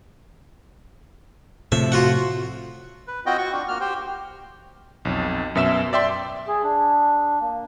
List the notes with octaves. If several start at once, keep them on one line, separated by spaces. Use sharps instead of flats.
A2 C3 F3 E5
F4 F#4 F#5
B4
C4 F4 F#4 D#5 F#5 G5
F#4 C#6
D4 F4
A#3 F#4 F6
G4 C5 G5
B1 F2
F#2 B2 E5 B6 E7
D5 E5 G5 C6
G#4
D4
A#3